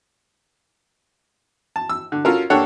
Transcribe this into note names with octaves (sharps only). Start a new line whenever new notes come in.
A5
E6
D3
C#4 F4 F#4 A4 A#4
A#3 D4 G4 A4 C#5 F#5